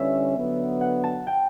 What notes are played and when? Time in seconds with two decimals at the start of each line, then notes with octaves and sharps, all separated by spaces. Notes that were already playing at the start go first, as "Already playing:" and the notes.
Already playing: D3 G3 C#4 E4 B4 C#5 E5
0.36 D3 F#3 B3
0.81 F#5
1.04 A5
1.27 G5